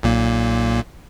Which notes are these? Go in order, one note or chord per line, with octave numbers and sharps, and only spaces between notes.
B1 A#2 A#3